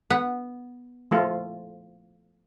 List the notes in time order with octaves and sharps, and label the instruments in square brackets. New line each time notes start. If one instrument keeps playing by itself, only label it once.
[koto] B3
[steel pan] F3 A3 F4